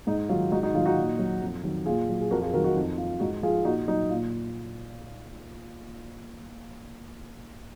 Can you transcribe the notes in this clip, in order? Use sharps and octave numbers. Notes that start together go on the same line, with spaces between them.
G#2 D#4
D#3 F#3 F4
G#2 D#4 F#4
D#4 F#4
D#3 F#3 F4
D#4 F#4
A#2
F#3
F2
D#3 F#3
A#2 F4 G#4
F#3
G#4
F2 F#4 A#4
F4 G#4
D#3 F#3 F#4 A#4
D#4 F#4
F2 D#4
F3 F4
G#2 D#4 F#4
F3 F4 G#4
A#2 D#4 F#4
F#3 D#4
A#2 F4